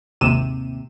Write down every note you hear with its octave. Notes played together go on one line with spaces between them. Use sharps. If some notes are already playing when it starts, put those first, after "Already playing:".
G#1 D#2 C3 D#7 E7